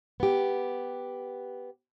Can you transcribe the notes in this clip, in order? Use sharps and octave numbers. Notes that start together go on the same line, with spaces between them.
B3 G4